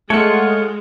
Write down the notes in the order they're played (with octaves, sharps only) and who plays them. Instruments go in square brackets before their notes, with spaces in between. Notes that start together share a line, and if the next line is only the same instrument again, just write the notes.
[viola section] G#3 [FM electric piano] A3 F#5 C#7 [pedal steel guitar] F4 C#5 [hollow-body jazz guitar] A4